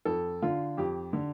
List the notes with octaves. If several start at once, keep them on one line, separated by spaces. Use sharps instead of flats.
F2 A4
D3 F4
F2 G4
D3